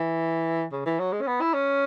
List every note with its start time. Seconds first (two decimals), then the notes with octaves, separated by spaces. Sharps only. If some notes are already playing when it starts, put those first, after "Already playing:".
Already playing: E3
0.72 C#3
0.85 E3
0.99 F#3
1.13 G#3
1.22 C#4
1.27 B3
1.41 E4
1.54 C#4